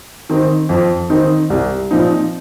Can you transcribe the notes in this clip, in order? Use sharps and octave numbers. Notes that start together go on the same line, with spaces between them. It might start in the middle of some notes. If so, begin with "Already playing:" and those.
D#3 C4 D#4
F2
D#3 C4 D#4
C2
A#2 F3 C4 D#4